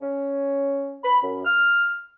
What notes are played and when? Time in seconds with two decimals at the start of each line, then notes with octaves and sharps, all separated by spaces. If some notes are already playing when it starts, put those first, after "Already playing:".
0.01 C#4
1.04 B5
1.23 F#2
1.45 F6